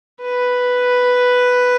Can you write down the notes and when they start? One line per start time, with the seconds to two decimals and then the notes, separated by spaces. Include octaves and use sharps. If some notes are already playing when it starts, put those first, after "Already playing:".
0.21 B4